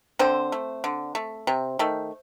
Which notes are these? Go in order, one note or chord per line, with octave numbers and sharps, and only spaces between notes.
D3 C4 C5
A3
D3
A3
C3
D#3 A3